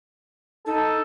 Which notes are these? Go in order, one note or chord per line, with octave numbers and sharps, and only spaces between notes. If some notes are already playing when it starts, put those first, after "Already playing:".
D#4 A4